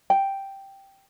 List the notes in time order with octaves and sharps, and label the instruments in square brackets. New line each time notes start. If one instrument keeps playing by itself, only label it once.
[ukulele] G5